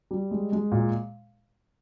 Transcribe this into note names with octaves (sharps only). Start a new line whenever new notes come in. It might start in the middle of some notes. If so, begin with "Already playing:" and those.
G3
G#3
G#3
A#2